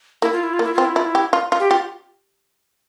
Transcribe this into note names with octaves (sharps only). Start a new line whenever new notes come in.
A#3 E4
F4
E4
F4
A#3
E4
C4 F4
E4
E4 F4
E4
G4
F4
F4
G4
F4 G4